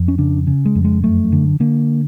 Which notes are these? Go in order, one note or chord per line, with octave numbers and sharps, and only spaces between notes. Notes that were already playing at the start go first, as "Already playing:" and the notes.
Already playing: F2
C#4
C#3 D4
C#3
G#3
F2
G#3
F#2 A3
D3
D3 A#3